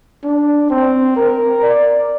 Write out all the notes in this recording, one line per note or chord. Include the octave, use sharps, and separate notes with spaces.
D4
C4
A#4
D5